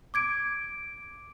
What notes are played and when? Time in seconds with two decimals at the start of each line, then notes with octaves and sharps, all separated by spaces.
0.14 D6 G#6 D7